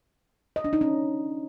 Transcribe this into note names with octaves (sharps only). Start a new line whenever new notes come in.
D#5
D4
D#4
C#4